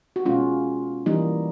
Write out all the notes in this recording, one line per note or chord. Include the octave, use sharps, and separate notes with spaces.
F#4
B2 G#3 C#4 F4
E3 G3 A#3 D#4